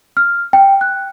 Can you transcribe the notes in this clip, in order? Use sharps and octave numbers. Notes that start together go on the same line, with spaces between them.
F6
G5
F#6